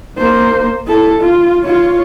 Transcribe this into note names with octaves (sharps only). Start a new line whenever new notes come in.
A#3 C5
E4 A4
F4
F4 C#5